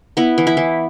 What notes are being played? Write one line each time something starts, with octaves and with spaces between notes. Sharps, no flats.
B3 E4
E3
E4
E3